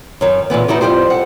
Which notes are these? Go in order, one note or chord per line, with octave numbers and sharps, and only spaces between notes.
F#2 D#3
A#2 D3 E3 B3
B3 D#4 E4 F#4 G4
F2 F3 G3 G4 C5
A4 F#5